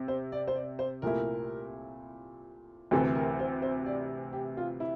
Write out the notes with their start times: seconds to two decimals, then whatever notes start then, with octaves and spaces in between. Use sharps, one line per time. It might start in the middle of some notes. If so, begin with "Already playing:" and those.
Already playing: C3
0.08 C5
0.32 D5
0.48 C5
0.55 D5
0.79 C5
1.02 C2 A#2 A3 E4 A#4
2.91 D2 C3 E3 A4
3.15 A#4
3.39 C5
3.62 C5
3.86 D5
4.33 G4
4.57 F4
4.80 E4